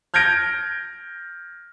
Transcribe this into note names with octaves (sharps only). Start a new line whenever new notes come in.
F6 G6 G#6 A#6 D7